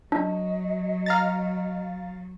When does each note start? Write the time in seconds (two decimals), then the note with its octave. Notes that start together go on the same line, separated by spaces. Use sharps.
0.12 F#3 D4 D#5
1.06 F5 A#5 A6